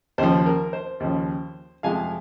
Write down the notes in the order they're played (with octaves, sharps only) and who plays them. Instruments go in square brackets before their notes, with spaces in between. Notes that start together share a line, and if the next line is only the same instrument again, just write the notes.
[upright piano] D#2 C#3 F3 C5
A#4
C5
D#2 C#3 F3
F2 C3 F3 G#3 F5 G#5